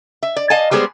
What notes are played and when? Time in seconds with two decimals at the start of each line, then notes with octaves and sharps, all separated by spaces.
0.23 E5
0.36 D5
0.50 D#5 F5 G#5 A5
0.71 G3 G#3 B3 G#4 C5